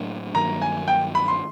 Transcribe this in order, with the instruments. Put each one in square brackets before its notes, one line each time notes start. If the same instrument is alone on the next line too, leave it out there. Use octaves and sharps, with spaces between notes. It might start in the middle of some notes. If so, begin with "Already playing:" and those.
Already playing: [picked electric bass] A2 F#3 A#3 D4
[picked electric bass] G2 D#3 F#3 A#3 [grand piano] A#5
[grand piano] G#5
G5
B5
C6